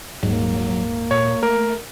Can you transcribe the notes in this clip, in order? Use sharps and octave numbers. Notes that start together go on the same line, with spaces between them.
D#1 G#2 F#3 A#3
A#2 C#5
A3 A#4